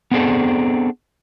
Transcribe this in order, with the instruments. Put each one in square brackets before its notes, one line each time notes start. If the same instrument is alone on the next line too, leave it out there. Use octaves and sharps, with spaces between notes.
[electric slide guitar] B3 C4 D4 G#4 A4